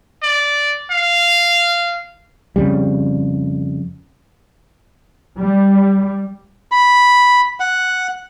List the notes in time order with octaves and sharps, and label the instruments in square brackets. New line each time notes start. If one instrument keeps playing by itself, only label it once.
[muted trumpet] D5
F5
[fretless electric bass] F2 C#3 G3
[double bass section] G3
[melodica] B5
F#5